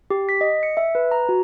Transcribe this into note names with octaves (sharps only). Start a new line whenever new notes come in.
G4
B6
D#5
C#7
E5
B4
A#5
F#4